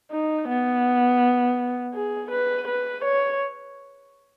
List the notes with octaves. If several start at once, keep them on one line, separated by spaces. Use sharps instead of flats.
D#4
B3
G#4
B4
B4
C#5